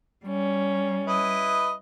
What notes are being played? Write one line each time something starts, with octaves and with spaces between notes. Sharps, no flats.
G3 C#4
E4 B4 D#5